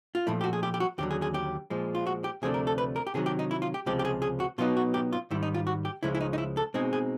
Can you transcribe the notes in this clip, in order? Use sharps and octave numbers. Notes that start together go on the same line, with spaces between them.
F4
A#2 F3 A3 E4
G4
F#4
G#4
G4
G4
F#4
D#2 D3 F#3 G4
G#4
G#4
G4
A#2 F3 G#3
F4
F#4
G4
D2 C3 F3 A3 D4 G#4
A#4
A4
B4
A#4
G4
C3 D#3 F#3 G#4
G4
D#4
E4
F4
G4
C#2 C3 F3 G#3 G4
G4
G#4
G#4
F#4
B2 F#3 B3 D#4 F4
F#4
G4
F4
G#2 D#3 G3 E4
D#4
F4
F#4
G4
C#2 C#3 F3 G#3 E4
E4
D#4
D#4
E4
A4
B2 G#3 C4 D#4 G#4
G#4